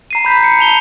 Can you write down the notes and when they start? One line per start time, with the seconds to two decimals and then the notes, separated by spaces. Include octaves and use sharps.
0.11 A#5 C7 D#7
0.25 B5 G6 B6
0.44 C#7
0.59 A5 F7 G7